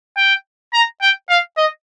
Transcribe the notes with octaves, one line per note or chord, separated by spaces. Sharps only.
G5
A#5
G5
F5
D#5